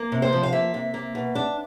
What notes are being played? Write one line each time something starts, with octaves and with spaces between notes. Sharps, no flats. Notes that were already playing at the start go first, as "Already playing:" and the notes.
Already playing: A#3
C3
C5
F3
F5
A#3 E5
C3
A#3
B2
D4